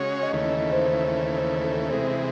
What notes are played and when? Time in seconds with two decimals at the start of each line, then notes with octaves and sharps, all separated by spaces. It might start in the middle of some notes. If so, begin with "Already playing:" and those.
Already playing: C#3 G#3 C#4 F#4 C#5
0.23 D#5
0.32 D#2 C#3 E3 A3 C#5
0.72 C5
1.12 C5
1.38 C5
1.64 A4
1.90 C3 E3 G#3 C5